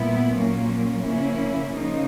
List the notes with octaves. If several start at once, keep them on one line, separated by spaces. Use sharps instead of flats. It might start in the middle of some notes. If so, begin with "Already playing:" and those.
Already playing: A#2 G3 B3 E4
A#2 F#3 A#3 C#4
C#3 F3 A#3 C#4 E4
C#3 F3 A#3 D#4